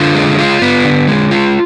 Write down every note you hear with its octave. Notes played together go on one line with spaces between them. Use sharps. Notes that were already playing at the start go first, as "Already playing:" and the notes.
Already playing: D3 F4
G#3
F4
B3
D3
G#3
F4